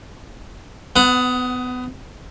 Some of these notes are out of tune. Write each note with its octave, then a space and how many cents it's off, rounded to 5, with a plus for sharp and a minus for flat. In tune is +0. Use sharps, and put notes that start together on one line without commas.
B3 +25 F#5 +0